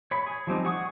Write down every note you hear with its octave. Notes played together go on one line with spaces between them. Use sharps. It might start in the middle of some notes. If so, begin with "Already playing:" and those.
C#5 B5
G#4
F3 G3 C4 D#4
G#4 F#5 C#6 D#6